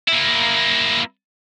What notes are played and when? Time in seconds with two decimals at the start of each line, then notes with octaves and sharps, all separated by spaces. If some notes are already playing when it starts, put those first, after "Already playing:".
0.08 A#3 E4